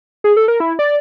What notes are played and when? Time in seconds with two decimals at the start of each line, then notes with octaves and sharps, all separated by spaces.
0.24 G#4
0.37 A4
0.48 A#4
0.60 E4
0.79 D5